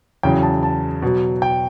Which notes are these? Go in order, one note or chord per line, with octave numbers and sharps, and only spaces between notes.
E2 C#3 F#3 G5
A5
A5
B2 F#3
G5